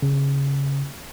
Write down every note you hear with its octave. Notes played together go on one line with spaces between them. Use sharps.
C#3